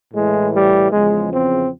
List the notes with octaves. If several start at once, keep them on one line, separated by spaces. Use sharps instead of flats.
A2 E3 G#3
G3
E2 C#3 F3 G#3
C4